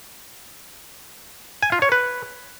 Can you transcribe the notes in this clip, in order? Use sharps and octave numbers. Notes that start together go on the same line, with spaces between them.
G#5
F4
C#5
B4